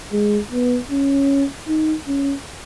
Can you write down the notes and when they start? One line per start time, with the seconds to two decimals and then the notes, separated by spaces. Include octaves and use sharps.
0.13 G#3
0.52 B3
0.91 C#4
1.68 D#4
2.08 C#4